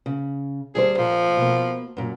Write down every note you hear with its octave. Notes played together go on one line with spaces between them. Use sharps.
C#3
D2 G3 G#4 C5
A#2 F3
B2 A#3
F#2 A#2